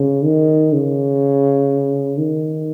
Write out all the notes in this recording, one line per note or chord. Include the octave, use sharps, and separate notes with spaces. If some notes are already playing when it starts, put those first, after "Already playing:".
Already playing: C#3
D#3
C#3
D#3